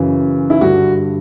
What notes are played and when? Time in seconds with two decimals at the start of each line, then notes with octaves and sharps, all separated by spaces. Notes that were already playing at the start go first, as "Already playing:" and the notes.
Already playing: F#2 C#3 E3
0.50 E4
0.61 G2 D3 F#4